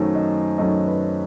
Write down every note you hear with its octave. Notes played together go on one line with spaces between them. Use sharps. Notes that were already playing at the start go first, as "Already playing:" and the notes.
Already playing: F#2 D#3 F#3 A3 C5
D#5
F#2 D#3 F#3 A3 D#5
B4